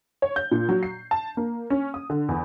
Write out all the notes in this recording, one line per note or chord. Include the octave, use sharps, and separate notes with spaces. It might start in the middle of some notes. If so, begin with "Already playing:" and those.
C#5
G6
A#2
F#3
C7
A5
A#3
C#4
D#6
D3
E2